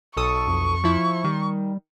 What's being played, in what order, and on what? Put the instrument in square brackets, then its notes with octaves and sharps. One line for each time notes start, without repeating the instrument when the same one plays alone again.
[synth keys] B1 A4 D#6 [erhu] C#6
[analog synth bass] F2
[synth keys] F3 E4
[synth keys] D#3 [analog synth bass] G3